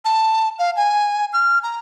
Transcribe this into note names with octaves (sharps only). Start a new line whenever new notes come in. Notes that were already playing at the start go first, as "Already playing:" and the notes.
A5
F5
G#5
F6
A#5